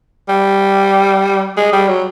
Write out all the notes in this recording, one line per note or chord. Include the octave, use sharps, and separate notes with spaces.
G3
G#3
G3
F#3